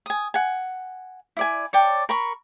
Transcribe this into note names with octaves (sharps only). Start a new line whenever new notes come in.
G#5 D#6
F#5 G#5
E4 D5 G#5
C#5 D5 G5 A5
A#4 B5 C#6